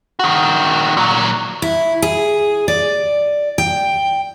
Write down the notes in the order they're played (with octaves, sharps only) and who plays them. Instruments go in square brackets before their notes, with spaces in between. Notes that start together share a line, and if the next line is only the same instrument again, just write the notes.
[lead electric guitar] D#3 F#4
A#2 F#3
[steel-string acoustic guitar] E4
G#4
D5
G5